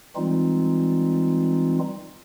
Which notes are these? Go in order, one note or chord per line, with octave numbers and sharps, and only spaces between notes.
E3 G3 G#3 C4 D#4 F4